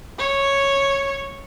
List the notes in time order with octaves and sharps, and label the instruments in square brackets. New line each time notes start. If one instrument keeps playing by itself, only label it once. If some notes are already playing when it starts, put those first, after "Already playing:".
[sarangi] C#5